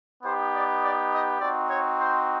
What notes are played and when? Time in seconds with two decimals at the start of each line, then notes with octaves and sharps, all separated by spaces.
0.23 B3 D#4 G4 C5
0.53 D5
0.82 D5
1.12 D#5
1.41 C4 D#4 F#4 D5
1.70 C#5
1.99 C5